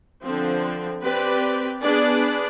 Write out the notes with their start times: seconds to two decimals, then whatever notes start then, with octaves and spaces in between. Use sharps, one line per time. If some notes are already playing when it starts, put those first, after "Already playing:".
0.23 D3 F3 C4
1.02 C4 G4 B4 D5
1.81 B3 D4 G#4 B4 D5